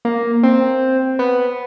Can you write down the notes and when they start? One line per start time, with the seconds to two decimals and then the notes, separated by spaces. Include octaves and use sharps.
0.05 A#3
0.43 C4
1.19 B3